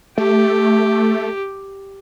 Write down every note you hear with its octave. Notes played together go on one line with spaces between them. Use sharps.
A3 G4